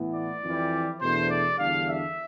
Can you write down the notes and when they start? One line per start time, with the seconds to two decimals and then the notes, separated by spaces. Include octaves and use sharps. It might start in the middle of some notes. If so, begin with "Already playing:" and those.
Already playing: A2 E3 B3
0.14 D5
0.44 F2 E3 G3
1.01 E2 B2 A3 D4 C5
1.30 D5
1.58 E2 D3 G3 D4 F5
1.88 E5